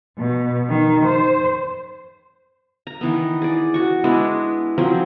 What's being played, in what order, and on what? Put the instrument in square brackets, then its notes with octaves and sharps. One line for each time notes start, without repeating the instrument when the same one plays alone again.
[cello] B2
D#3
C5
[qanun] A#5
D#3 E3 B3
G#4 D5
F#4 C#6
G#3 B3 D4 E4
F3 F#3 C4 G#4